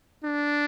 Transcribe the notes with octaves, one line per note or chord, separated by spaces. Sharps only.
D4